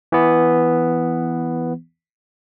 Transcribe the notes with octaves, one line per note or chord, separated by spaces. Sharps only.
E3 B3